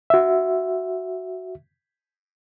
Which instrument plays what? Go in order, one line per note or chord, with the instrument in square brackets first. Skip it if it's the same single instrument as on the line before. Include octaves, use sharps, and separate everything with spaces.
[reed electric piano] F#4 E5